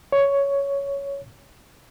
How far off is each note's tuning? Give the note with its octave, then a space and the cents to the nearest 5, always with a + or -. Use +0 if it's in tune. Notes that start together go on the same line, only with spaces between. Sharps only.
C#5 +10